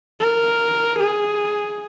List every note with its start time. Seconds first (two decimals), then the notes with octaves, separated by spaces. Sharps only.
0.20 A#4
1.00 G#4